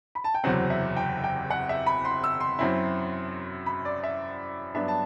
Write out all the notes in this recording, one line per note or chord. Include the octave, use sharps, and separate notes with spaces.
B5
A5
G5
F#1 E2 C3 F#3 C4 F#5
E5
G5
G5
F#5
E5
B5
C6
E6
C6
F#2 F#3 C4 E4
B5
D5
E5
G2 F#3 B3 D4 E5
A5